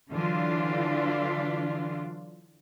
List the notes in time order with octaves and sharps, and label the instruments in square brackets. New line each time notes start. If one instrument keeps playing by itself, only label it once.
[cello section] D3 E3 F#3 D4 F4